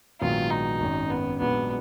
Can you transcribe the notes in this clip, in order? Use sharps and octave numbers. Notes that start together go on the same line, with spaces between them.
A#1 G#2 D#3 F#3 B3 F4
D#4
G#1 F#2 D#3
B3
A#1 G#2 F#3 B3 D4